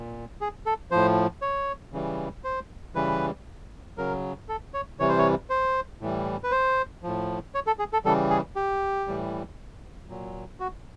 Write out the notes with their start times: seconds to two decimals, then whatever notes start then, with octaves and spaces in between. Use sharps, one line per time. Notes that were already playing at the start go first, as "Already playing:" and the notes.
Already playing: A#2
0.41 G#4
0.66 A4
0.91 A2 F3 C5
1.42 C#5
1.93 C#3 E3 G3
2.44 C5
2.95 C#3 E3 G3 B4
3.98 C#3 F#3 A#4
4.49 A4
4.74 C#5
5.00 C3 E3 G3 C#5
5.09 C5
5.18 C#5
5.50 C5
6.01 A2 E3 G3
6.44 B4
6.51 C5
7.03 A2 F3
7.55 C#5
7.67 A4
7.79 G#4
7.93 A4
8.05 C#3 E3 G3 A4
8.30 G#4
8.56 G4
9.07 A2 E3 G3
10.09 A#2 F#3
10.60 F#4